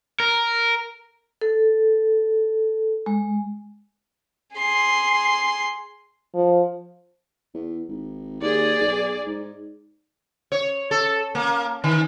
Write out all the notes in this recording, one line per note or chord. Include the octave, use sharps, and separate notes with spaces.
A#4
A4
G#3
G#4 C6
F3
E2
G#1
D#2 G#4 D5
B1
G#2
C#5
A4
A#3
D#3